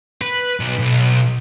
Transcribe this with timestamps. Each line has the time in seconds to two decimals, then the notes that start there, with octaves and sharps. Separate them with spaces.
0.22 B4
0.60 B1
0.79 B1